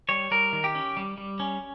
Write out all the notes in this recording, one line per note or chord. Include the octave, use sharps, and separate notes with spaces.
G3 C#5
G3 A#4
D#3
G4
C#4
G3
G3
C#4